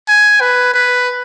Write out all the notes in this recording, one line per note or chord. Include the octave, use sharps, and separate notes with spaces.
G#5
B4
B4